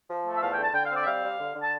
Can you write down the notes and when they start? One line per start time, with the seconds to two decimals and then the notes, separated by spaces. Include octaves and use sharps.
0.09 F3
0.25 A3
0.36 E5
0.41 E2 F5
0.52 G5
0.58 D3 A5
0.74 D3 G5
0.85 F5
0.91 C4 D5
1.02 E5
1.06 G3 F5
1.23 G3
1.39 D3
1.55 D3
1.62 A5